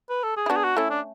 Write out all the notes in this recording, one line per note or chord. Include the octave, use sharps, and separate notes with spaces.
B4
A4
G#4
E4
B3 D4 F#4
G#4
F#4
A3 C#4 E4
D4